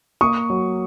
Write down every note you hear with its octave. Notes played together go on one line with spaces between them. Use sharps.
A#3 C#6 D#6
F#3